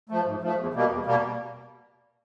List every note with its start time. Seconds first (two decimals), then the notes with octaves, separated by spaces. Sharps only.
0.09 F3 A3
0.26 G#2
0.41 F3 A3
0.57 E2
0.74 B2 G3 A#3
0.89 E2
1.06 B2 G3 A#3